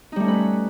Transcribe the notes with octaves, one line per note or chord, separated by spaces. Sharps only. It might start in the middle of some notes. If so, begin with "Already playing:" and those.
G3 A3 C#4 D#4 B4